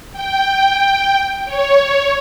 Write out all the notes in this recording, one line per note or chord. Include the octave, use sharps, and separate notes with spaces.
G5
C#5